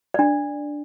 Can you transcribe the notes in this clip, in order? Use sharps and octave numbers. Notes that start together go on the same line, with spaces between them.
D4 D5